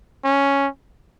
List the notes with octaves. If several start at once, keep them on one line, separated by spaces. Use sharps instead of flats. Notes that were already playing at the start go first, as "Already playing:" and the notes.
C#4